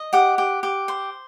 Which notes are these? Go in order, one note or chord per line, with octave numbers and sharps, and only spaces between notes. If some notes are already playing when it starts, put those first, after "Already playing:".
Already playing: D#5
G4 F#5
G4
G4
C5